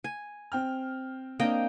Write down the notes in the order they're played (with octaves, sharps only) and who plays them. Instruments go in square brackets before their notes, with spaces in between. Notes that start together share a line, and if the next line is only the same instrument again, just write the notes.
[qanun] G#5
[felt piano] C4 G5 F6
[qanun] A#3 D#5 G5 [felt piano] C4 D4